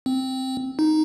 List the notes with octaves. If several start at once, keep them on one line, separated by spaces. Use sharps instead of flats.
C4
D#4